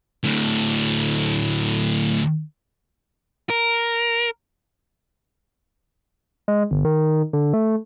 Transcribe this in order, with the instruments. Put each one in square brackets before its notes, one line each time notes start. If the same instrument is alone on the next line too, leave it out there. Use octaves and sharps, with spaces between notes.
[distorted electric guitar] D2 A2
[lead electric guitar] A#4
[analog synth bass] G#3
G1
D#3
D3
A3